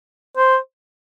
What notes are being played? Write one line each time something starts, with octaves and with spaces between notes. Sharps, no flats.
C5